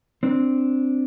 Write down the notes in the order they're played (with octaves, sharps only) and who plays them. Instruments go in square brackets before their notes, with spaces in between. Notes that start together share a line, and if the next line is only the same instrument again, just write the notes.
[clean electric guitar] C4 D4